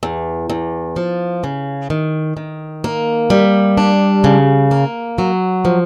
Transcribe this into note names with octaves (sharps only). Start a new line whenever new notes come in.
E2
E2
F3
C#3
D#3
D#3
A#3
G3
D4
C#3
A#3
F#3
F3